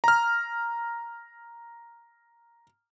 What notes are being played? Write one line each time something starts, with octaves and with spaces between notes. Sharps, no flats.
A#5 F6